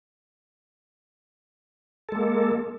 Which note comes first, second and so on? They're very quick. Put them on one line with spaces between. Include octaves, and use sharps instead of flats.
A4 G#3 A#3